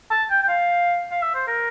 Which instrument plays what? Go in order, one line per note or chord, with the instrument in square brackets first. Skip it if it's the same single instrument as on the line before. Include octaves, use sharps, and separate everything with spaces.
[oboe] A5
G5
G5
F5
F5
E5
C5
A#4